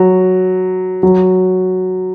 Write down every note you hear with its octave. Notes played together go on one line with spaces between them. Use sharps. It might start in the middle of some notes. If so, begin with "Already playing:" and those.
Already playing: F#3
F#3